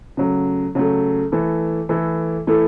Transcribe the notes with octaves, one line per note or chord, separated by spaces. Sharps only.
C#3 F#3 A3
C#3 F#3 A3
E3 A3 E4 A4
E3 A3 E4 A4
E3 A3 E4 A4